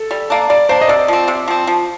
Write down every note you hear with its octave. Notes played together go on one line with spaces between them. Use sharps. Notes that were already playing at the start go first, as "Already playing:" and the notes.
Already playing: A4
G3
A#3 D4
G3 D5
A#3 D4 C5
D#5
C3 D5
F3 C4
C3
F3 C4
F3